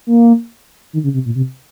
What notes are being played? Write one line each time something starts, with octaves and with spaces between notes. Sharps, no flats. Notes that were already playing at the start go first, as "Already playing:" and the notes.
A#3
D#3
C#3
C3
A#2
C3